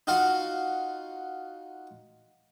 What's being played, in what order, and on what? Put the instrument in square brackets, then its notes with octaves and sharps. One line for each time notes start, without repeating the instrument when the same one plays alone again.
[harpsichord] D#4 F4 F#4 F5 F#5